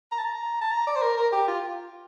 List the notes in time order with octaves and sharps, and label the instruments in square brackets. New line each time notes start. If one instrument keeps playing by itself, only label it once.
[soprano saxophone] A#5
A5
A#5
A5
A#5
D5
C5
A#4
A#4
G4
F4